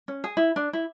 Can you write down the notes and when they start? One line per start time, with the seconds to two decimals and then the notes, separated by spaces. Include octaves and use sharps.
0.08 C#4
0.24 G#4
0.37 E4
0.56 D4
0.73 E4